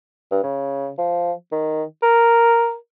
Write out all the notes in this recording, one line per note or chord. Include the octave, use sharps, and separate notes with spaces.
G2
C#3
F3
D#3
A#4